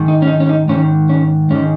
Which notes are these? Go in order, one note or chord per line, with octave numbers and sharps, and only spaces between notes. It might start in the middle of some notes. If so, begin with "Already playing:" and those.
Already playing: G#2 D#3
D#4
C#4
D#4
C#4
D#4
G#2 D#3 C#4
C#4
G#2 D#3 C#4